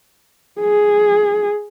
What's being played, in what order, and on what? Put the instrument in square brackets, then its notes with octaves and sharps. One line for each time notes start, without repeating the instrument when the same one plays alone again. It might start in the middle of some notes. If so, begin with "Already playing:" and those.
[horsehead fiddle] G#4